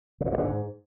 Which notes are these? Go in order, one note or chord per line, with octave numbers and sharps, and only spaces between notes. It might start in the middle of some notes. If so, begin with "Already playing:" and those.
C#3
A#2
G2
D3
G#2